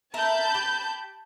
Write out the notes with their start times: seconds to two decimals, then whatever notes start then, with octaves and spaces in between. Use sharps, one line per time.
0.14 A#4 E5 A5 B5 G6
0.55 G4